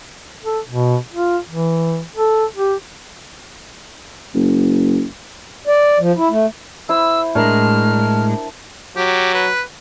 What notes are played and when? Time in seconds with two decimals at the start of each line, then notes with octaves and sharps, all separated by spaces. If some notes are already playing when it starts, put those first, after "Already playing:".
0.44 A4
0.68 B2
1.13 F4
1.49 E3
2.16 A4
2.56 G4
4.35 F#1
5.67 D5
6.00 F3
6.17 E4
6.30 A3
6.89 E4 C5 E6
7.35 A2 G#3 D4 A#4 F6
8.96 F#3 G4
9.34 B4